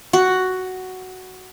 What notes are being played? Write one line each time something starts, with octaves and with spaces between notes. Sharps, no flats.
F#4